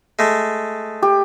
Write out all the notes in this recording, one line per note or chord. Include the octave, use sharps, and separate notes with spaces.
G#3 A3
G4